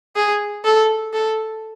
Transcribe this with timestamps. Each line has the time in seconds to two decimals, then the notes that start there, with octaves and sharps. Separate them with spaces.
0.16 G#4
0.64 A4
1.13 A4